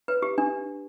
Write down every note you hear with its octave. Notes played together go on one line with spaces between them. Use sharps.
B4
G4
D4